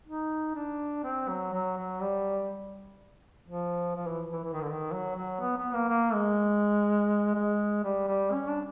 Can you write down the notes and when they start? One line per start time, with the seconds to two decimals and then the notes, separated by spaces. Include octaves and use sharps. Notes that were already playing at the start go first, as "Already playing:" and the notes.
0.07 D#4
0.55 D4
1.04 C4
1.28 F#3
1.53 F#3
1.77 F#3
2.01 G3
3.47 F3
3.95 F3
4.07 E3
4.32 E3
4.44 E3
4.53 D#3
4.61 D3
4.70 D#3
4.92 F#3
5.16 F#3
5.40 B3
5.57 B3
5.74 A#3
5.89 A#3
6.14 G#3
7.35 G#3
7.84 G3
8.07 G3
8.32 C#4
8.48 D4